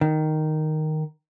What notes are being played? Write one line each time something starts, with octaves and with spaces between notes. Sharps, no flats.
D#3